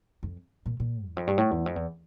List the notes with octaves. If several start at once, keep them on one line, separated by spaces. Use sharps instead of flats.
F2
A#2
A#2
E2
F2
G2
A2
E2
F2
E2